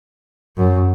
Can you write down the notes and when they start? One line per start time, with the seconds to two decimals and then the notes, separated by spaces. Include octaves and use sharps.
0.57 F#2